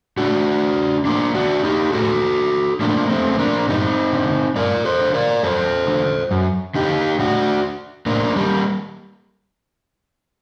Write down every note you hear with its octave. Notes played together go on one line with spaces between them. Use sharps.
A2 D4 F#4
A2 A#3 D4
D4 F#4
D#4 G4
A2 F#4 A4
A2 A#3 D4
A3 C4
C4
A#3 D4
G2 C4 D#4
D3
G2 A#4 D5
A4 C5
D3
A#4 D5
F#2 A4 C5
D3
F#2
D3 D#4 G4
A2 D4 F#4
A2 A#3 D4
G3 A#3